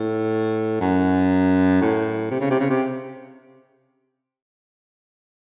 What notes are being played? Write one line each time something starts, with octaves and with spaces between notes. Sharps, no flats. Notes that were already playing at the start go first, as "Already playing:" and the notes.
Already playing: A2
F#2
A2
C3
C#3
C3
C#3
C3